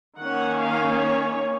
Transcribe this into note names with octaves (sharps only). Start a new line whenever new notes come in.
D#3 A#3 C#4 F#5
F5
C#5